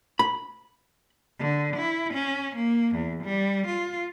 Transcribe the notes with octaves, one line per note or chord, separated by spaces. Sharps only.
B5
D3
E4
C#4
A#3
E2
G3
F4